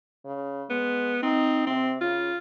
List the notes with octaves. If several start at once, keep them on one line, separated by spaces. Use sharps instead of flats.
C#3
G#3 B3
C4 D#4
C3 C4
C#3 F4